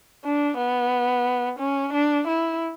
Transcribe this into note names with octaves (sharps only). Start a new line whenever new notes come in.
D4
B3
C#4
D4
E4